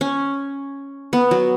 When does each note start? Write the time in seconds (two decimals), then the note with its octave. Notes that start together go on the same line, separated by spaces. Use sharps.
0.01 C#4
1.13 B3
1.31 F#3